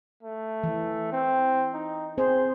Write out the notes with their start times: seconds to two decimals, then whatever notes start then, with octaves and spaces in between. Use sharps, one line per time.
0.23 A3
0.64 E3
1.12 C4
1.74 D#4
2.18 C4 G#4 C5